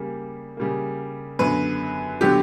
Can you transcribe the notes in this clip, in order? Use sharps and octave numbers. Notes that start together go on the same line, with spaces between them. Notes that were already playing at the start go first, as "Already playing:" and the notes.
Already playing: C#3 G3 A#3
C#3 G3 A#3
F#2 D3 F#3 B3 B4
D3 F#3 B3 G4